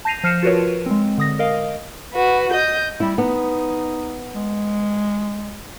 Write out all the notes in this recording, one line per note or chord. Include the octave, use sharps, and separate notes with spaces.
A5 G6 A#6 C7 D#7 F7
F3 F6 C7 C#7 E7
F4 F#4 A#4 B4 C#5
G#3 C4
D3 D#6 A#6
A#4 D#5 F5
F#4 B4
D#5 G6
G3 E4
B3 D#4
G#3